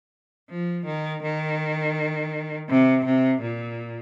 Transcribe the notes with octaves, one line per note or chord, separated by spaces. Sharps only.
F3
D#3
D#3
C3
C3
A#2